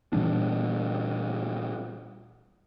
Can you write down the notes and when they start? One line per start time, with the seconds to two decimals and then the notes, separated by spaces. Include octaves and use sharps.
0.13 A#2 E3 G3 D4